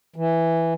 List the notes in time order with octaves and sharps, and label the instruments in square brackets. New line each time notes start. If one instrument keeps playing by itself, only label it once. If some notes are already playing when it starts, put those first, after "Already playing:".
[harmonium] E3